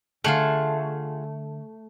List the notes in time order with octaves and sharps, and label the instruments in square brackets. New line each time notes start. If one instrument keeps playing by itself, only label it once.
[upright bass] D3 [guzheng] A3 [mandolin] F4 G#4 F#5